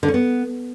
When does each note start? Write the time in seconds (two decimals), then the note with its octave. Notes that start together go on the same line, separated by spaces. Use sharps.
0.03 D3
0.08 C#4
0.14 B3